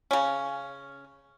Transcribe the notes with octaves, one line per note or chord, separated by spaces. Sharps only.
C#3 C#4